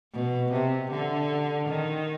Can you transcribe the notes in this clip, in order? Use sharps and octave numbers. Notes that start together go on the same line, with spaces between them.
B2
C3
D3
D#3